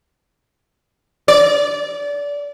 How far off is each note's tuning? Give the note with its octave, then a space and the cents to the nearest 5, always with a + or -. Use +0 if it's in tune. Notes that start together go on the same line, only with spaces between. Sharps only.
D5 -25